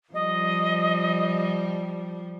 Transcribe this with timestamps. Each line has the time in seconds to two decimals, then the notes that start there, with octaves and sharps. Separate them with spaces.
0.14 F3 G3 D#5